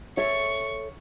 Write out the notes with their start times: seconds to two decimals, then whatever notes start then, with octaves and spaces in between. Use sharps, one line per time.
0.17 A4 C#5 E5 C#6